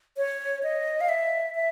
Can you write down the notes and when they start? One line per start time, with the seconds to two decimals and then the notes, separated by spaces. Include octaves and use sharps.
0.17 C#5
0.63 D#5
1.01 F5
1.09 E5
1.55 E5